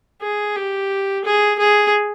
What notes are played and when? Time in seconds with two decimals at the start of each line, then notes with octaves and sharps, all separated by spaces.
0.22 G#4
0.56 G4
1.25 G#4
1.59 G#4